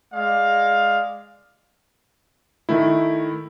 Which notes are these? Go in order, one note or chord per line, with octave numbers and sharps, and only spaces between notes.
G#3 D5 F5
D#3 A3 E4